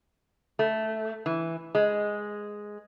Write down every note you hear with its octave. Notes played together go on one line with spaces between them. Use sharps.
A3
E3
G#3